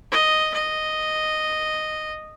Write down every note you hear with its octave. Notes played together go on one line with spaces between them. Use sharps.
D#5
D#5